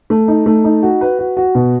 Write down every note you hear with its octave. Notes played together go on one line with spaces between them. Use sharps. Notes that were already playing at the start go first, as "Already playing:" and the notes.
A3
D#4
A3
D#4
F#4
B4
F#4
F#4
B2